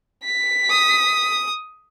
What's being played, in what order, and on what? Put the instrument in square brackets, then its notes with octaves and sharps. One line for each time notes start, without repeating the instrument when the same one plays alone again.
[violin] B6
[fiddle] D#6